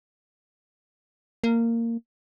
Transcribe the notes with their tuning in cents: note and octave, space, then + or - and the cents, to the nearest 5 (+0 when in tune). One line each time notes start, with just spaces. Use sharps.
A#3 -15